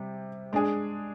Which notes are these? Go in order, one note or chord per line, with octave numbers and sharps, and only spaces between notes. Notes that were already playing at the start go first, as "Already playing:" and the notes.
Already playing: C3 G3
G#3 D4 G#4